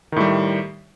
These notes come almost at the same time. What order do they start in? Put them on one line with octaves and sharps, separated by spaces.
D#3 A2 G3